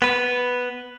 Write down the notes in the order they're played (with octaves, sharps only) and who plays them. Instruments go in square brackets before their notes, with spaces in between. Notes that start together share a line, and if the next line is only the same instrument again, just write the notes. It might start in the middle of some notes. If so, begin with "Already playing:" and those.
[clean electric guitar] B3 B4